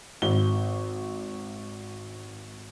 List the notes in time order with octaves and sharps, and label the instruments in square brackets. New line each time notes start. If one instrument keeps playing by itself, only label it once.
[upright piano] G#1 G7